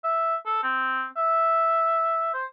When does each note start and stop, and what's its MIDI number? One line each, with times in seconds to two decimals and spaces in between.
0.04 0.36 76
0.46 0.59 69
0.63 1.06 60
1.17 2.30 76
2.34 2.45 72